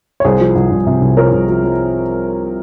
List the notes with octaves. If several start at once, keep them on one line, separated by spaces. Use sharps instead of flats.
C#5
C2 G#4 C5
F3
C2
C2
C3
C2
F3 A#4 C#5
C2
F3
F3